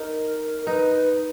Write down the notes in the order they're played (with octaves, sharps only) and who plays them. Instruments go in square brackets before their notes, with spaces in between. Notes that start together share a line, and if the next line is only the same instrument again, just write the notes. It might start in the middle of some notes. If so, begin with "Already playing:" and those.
Already playing: [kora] D#4 [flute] A#4
[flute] A#4
[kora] D#4 [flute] B4